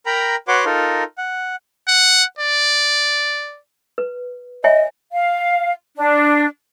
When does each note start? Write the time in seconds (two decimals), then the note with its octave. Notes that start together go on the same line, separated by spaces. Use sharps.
0.06 A#4 G5 A#5 B5
0.48 F#4 B4 C#5 F#5 C6 D6
0.65 D#4 F4 A4 A#4
1.18 F#5
1.88 F#5
2.39 D5
3.98 B4
4.64 C#5 D#5 E5 G#5
5.12 F5
5.97 D4